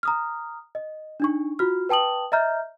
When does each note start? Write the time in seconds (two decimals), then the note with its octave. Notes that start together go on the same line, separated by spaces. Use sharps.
0.03 A#5 D#6 F6
0.75 D#5
1.20 D4 D#4 C#6
1.59 F4 F#4 F6
1.89 B4 G5 A5 D#6 F#7
2.32 D#5 E5 A#5 F6 G6